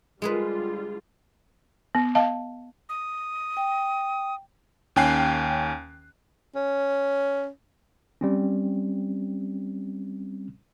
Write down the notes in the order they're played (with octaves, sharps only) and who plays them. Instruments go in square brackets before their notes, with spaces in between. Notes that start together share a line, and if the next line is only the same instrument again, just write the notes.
[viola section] D3 G3 F4 [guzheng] G#3 G#4 B4
[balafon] B3
D#5 F5 A5
[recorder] D#6
[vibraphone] G5
[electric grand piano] D#2 C#4 G5 G#5 F#6 C7
[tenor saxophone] C#4
[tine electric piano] G3 C4 C#4